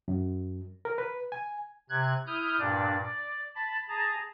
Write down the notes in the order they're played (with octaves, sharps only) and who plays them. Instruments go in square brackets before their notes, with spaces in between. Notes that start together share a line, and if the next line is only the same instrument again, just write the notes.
[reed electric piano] F#2
A#4
B4
G#5
[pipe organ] C3 F#6 G#6
E4 D#6 F6 G6
G2 A#2 D4 D5
D5
A5 B5
G#4 A5 A#5